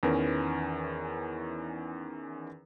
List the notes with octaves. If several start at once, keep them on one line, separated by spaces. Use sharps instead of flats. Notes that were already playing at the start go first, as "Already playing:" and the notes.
E2 D#3 E3 C#4 A#4 B4